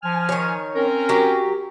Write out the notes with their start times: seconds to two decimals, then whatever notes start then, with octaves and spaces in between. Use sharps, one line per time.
0.03 F3 G#5 F6
0.29 D#3 C#5
0.76 C4 C#4 A#4
1.09 F#3 G4